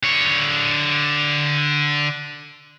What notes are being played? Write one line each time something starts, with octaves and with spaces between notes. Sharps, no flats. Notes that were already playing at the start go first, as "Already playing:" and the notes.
D3 C#5